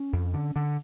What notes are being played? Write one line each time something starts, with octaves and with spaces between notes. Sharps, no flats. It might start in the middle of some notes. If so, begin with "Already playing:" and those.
Already playing: C#4
F2
D3
D3